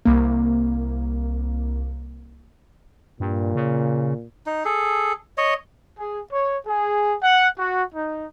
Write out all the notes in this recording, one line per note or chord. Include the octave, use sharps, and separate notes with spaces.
C2 A#3
G2 A#2
C#3
D#4
G#4 A4
C#5 D#5
G#4
C#5
G#4
F#5
F#4
D#4